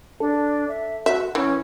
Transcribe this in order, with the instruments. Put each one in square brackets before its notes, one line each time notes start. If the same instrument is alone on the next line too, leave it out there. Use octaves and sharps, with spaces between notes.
[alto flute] D4 [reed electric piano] A4
[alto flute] E5
[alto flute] F#4 [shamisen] E5
[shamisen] E3 [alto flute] C#4